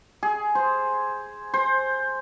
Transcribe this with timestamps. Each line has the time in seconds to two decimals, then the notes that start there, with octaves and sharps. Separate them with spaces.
0.23 G#4
0.55 C5
1.54 C5